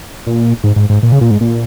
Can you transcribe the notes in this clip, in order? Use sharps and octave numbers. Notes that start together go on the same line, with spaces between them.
A#2
G#2
G#2
G#2
A#2
C#3
A#2
G#2
A#2